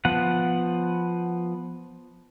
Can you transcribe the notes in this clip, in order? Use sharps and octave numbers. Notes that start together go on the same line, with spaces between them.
F3 B3 F#5